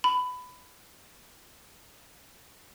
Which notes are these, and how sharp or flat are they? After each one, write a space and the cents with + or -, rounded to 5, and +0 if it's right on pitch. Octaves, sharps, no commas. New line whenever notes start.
B5 +15